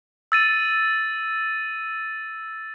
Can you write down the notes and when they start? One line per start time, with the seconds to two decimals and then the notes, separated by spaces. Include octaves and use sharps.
0.32 E6 A6 D#7